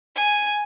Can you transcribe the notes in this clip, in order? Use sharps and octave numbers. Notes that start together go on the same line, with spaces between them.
G#5